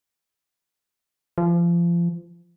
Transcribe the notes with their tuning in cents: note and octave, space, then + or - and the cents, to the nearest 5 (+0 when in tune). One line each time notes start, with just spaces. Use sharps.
F3 -30